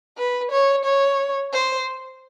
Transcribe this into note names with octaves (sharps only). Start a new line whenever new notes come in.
B4
C#5
C#5
C5